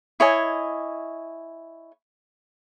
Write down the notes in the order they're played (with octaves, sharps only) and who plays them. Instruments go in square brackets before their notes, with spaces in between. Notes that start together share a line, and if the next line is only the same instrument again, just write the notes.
[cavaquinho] E4 C#5 D#5 G#5